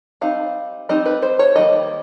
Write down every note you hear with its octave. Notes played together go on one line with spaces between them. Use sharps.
G3 C4 D#4 F5
G3 C4 D#4 D#5
B4
C5
C#5
D#3 G3 A#3 D#5